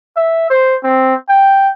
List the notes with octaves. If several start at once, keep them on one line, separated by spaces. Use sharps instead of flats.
E5
C5
C4
G5